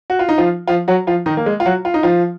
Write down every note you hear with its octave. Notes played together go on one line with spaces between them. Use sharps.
F#4
F4
D#4
F3 F4
F3 F4
F#3 F#4
F3 F4
D#3 D#4
A#3
G#3
F4
F#3 F#4
F4
D#4
F3 F4